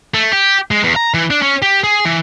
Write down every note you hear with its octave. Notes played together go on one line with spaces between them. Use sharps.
A3
G4
G#3
E2
A#5
E3
D4
C#4
G4
G#4
E3